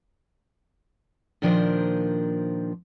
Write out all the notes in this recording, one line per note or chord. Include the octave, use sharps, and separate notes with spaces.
A#2 D#3 F3 D4 A#4 C5